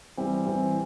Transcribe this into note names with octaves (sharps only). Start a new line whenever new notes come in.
E3 G3 C4
E3 G3 C4